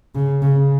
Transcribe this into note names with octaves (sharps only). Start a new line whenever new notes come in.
C#3
C#3